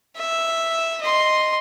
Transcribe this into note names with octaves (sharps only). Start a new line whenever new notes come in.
E5
D#5 C6